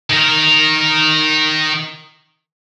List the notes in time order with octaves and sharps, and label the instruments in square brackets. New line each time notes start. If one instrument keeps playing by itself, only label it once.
[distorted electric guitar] D#3 A#4